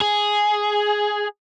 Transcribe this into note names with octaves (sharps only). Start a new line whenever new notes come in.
G#4